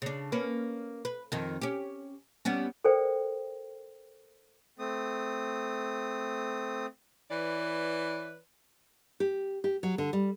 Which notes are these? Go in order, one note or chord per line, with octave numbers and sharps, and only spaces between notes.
C#3 D4
A#3 C#4 B4
B4
F2 D#3
C#4 G4
G3 B3 C#4
A4 A#4 C5 D5 G5
A3 C4 D#6
E3 B4 C#5 D5
G4
G4
F#3
D3
G3